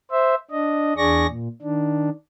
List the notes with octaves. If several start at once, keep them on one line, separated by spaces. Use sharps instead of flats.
C5 E5
D4 D#5
E2 D4 G#4 D5 C#6 A#6
A#2
D#3 D4